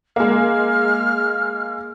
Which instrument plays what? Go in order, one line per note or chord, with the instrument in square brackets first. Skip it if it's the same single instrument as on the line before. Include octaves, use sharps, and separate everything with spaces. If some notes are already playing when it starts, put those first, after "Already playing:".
[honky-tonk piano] G#3 A#3 [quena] F6